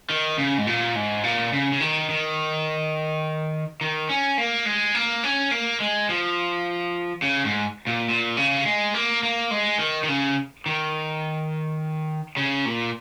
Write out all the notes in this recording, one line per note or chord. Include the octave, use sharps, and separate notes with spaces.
D#3
C#3
G#2
A#2
G#2
A#2
C#3
C#3
D#3
D#3
D#3
C#4
A#3
G#3
A#3
C#4
A#3
G#3
F3
C#3
G#2
A#2
A#2
C#3
G#3
A#3
A#3
G#3
D#3
D#3
C#3
D#3
C#3
A#2